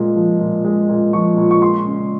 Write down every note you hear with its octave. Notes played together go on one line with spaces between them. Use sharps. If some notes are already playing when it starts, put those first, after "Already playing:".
Already playing: A#2 G#3
F3
A#2
G#3
A#2
F3 C#6
A#2
C#6
G#3 C6
C#3